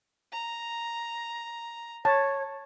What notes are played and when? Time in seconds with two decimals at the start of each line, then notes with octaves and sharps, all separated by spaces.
0.32 A#5
2.05 C#5 A5